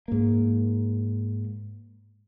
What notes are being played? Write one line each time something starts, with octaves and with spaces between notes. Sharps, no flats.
G#2 A#3